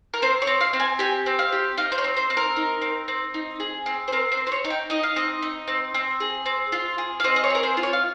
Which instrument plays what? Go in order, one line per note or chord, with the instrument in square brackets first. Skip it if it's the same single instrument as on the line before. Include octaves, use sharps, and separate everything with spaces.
[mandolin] A#4
C4 C5
C#5
C4
F5
C4
G#5
G4 G#5
C4
F5
G4
D#4 F5
C5
C#5
C4
C5
C4
A#4
D#4
C4
C4
D#4
G#4
C4
C5
C4 A#4
C5
C4
C5
C#5
D#4
G5
D#4 D#5
F5
C4 D#5
D#4
C4
C4
G#4
C4
F4
G#4
F5
C4 D#5
D#5
C#5
G#4 A#4
C5
F4
C#5
F5